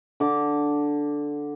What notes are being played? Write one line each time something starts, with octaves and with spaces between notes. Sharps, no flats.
D3 D6